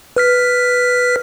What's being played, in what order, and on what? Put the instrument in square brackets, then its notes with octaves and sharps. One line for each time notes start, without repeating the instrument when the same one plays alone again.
[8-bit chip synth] B4 F6 B6